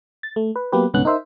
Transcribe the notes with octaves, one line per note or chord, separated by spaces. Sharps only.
A6
A3
B4
F#3 A#3 B3 G4 B4
C2 G#2 D3 B3 C#4 F#6
D#4 A#4 C5 E5